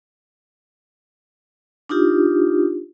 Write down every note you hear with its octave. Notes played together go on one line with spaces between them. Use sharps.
D4 D#4 F4 G4